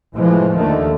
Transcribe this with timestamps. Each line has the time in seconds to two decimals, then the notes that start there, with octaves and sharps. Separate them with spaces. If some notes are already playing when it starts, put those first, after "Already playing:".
0.15 A2 C3 E3 F3 G#3
0.56 D#2 D3 D#3 A3